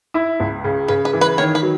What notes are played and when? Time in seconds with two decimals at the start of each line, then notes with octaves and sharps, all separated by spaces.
0.14 E4
0.40 C#2
0.64 C#3
0.88 C#3 B4
1.05 B4
1.13 E3
1.21 B4
1.38 D#3 C#5
1.55 B4
1.63 F#3